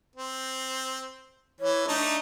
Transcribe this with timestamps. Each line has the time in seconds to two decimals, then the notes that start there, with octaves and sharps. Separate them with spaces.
0.15 C4
1.60 E3 C#5
1.88 A3 D4 D#4